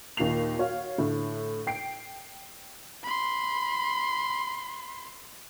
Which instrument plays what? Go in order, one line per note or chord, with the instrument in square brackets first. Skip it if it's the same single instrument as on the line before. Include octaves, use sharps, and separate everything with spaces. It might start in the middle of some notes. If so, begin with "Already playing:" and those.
[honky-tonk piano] D#2 A#2 F4 C7 F7
F#4 C#5 F5
A2 D3 A3
G5 C7 D7
[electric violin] B5 C6